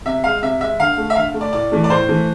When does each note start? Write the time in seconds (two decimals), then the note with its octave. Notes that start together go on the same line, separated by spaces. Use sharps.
0.05 C3 E5
0.24 G#3 F5
0.42 C3 E5
0.61 G#3 E5
0.79 D3 F5
0.97 A3
1.10 E5
1.15 D3 F5
1.34 A3
1.41 D5
1.53 A2 D5
1.72 E3 A3
1.84 D5
1.89 A2 C5
2.09 E3 A3